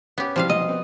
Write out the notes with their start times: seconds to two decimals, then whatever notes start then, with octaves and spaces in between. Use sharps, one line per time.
0.18 B3 C#4 G4
0.36 C3 E3 F3 G3 C4 F5
0.50 B1 D#5
0.68 B3 C4